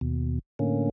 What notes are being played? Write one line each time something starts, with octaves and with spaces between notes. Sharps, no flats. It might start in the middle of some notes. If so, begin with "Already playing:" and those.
D#2 B2
A2 D3 A#3 C#4